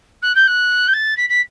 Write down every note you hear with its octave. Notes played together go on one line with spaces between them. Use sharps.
F#6
G6
F#6
G6
A6
B6
B6